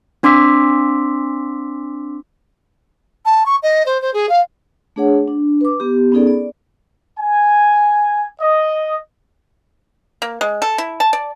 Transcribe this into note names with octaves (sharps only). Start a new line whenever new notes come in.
C4 D4 C6 D6 E6 B6
A5
C#6
D#5
C5
C5
G#4
F5
A3 D4 G#4 C#5 F#5
D4
B4 D6
B3 G4
B3 C#4 D#4 G#4 A4 D5
D5
G#5
D#5
A#3
G#3
A4
E4
A5
D5